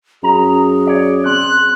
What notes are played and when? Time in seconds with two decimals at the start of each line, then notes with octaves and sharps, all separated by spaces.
0.23 F#2 G#4 A#5
0.87 C#5 D5
1.26 C4 F#6